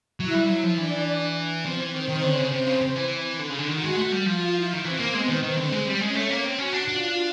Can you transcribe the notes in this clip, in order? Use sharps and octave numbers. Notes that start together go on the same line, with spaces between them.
F#3 E4 E5
G3
F#3
F3
E3 D4 D5
F3 C4 C5
E3
D#3 C4 C5
D#3
D3 C#4 C#5
C#3
C3 C4 C5
C#3
C#3
E3
D3
C#3
D3
D#3 F#4 F#5
G#3
A3
G3
F3 F4 F5
E4 E5
D#3
E3 C4 C5
A#3
G#3 B3 B4
D#3
D#3 C4 C5
D3
G#3
G3
G#3 C#4 C#5
A3
A#3
C4
C#4 F#4 F#5
D4
D4 F4 F5